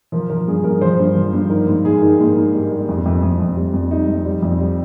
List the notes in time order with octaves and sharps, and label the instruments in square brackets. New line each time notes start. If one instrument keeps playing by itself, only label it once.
[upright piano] F3 A#4
F3 A#4
G2 G#4
G2 A#4
F3 C5
G2
F3
G2
D#3 A#4
G#2
G#2 G#4
D#3
G#2 A#3
G#2
G3
G3
F2
F2
F2
F2
G3
F2
G3 D#4
F2
G3
F2
G3